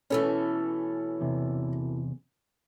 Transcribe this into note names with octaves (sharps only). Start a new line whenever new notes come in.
B2 E3 A3 C#4 A4
E2 C3